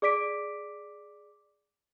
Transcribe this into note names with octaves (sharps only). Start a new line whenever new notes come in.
G#4 D5 D6 B6 D7